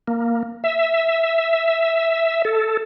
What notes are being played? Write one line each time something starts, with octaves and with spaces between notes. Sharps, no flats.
A#3
E5
A4